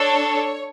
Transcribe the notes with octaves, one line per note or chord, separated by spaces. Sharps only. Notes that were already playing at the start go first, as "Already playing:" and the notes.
Already playing: D4 A4 C#5